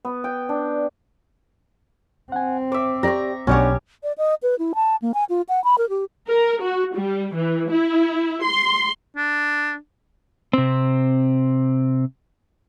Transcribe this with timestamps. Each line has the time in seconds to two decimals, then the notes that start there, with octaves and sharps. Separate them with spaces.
0.05 B3
0.24 G5
0.49 D4
2.32 C4 F#5 G#5
2.72 C5 E5 D6
3.03 G4 D5 A#5 C#6
3.47 B1 B2 B3 C#4 D4 G4 C#5 F#5
4.03 D5
4.18 D#5
4.43 B4
4.59 E4
4.75 A5
5.02 A#3
5.14 G#5
5.29 F4
5.49 F#5
5.64 B5
5.78 A#4
5.89 G4
6.28 A#4
6.62 F#4
6.95 G3
7.35 E3
7.71 E4
8.44 C6
9.16 D4
10.53 C3 C4